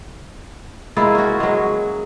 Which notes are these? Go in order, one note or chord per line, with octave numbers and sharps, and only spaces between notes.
G#3 A#3 E4 F4
C#4 F#4
F#3 G#3